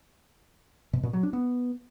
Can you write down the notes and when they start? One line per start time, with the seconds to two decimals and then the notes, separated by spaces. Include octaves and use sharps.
0.93 B2
1.03 A#2
1.13 F#3
1.23 D4
1.33 B3